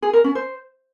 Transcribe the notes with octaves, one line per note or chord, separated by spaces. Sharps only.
G#4
A#4
C#4
C5